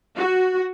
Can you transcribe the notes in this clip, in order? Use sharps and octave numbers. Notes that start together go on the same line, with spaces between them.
F#4